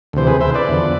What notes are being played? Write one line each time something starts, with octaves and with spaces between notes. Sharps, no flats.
D2 C3 E3 C5
G#4 B4
C5 E5
B4 D5
E2 D3 F3